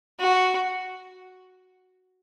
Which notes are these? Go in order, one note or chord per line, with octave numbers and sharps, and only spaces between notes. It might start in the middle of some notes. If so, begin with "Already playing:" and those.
F#4